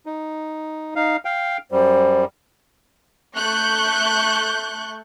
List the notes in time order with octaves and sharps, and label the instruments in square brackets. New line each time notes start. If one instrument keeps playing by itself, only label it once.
[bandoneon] D#4
D#4 F5
F5 G5
[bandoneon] F#2 G3 [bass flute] C5
[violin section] A3 C#6 F#6 G6